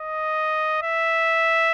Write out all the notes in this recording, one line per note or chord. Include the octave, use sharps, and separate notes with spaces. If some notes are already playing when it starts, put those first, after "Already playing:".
Already playing: D#5
E5